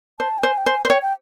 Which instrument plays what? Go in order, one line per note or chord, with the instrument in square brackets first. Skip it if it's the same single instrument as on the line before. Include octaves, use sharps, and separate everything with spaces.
[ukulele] C5 [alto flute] A5
[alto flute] G5
[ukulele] C5 [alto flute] G#5
[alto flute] G5
[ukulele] C5 [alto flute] G#5
[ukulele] C5
[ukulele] C#5 [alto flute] G5
[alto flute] G5